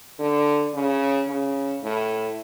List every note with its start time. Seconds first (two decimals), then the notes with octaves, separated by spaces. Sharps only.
0.19 D3
0.74 C#3
1.28 C#3
1.83 A2